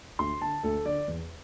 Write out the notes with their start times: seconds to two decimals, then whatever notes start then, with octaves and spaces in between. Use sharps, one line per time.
0.19 D2 C6
0.42 D3 A5
0.63 D2 A4
0.86 D3 D5
1.08 E2